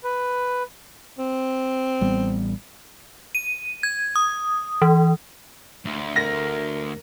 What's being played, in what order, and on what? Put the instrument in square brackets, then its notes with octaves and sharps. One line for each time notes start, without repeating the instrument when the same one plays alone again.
[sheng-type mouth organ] B4
[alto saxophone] C4
[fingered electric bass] A1 G3 B3
[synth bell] D#7
G#6
D#6
E3
[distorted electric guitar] D2
[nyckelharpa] A#4 [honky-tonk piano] A#6